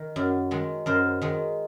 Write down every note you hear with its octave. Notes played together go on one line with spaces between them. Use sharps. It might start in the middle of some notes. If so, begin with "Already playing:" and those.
Already playing: D#3
F#2
D#3 G#3
F#2 A#4 C5
D#3 G#3